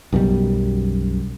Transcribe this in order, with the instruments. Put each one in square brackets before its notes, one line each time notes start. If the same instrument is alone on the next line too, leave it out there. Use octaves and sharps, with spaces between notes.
[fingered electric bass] B1 F#2 B2 G3